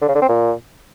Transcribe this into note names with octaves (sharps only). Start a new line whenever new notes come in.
D3
C#3
D3
C4
A#2